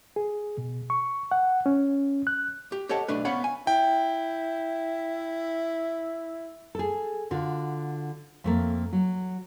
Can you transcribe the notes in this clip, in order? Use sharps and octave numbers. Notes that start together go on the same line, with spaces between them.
G#4
B2
C#6
F#5
C#4
F#6
G4
G4 A4 C#5 D#5 F#5 A5
B1 A3 D4 B4
B3 C#4 B4 C#5 F5 F#5
G#5
E4 G5
G#4 A4
D3 F4 F#4
F2 A3 A#3
F#3